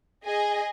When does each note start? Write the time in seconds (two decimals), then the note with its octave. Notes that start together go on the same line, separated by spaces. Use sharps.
0.24 G#4 D#5 G#5